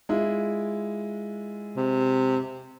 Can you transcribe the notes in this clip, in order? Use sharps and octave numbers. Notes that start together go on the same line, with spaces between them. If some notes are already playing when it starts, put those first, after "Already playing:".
G#3 E4 F4
C3